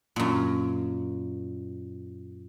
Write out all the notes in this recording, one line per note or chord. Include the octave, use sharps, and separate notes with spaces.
F#2 A#2